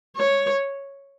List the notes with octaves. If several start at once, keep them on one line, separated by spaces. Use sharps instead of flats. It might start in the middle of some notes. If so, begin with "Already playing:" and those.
C#5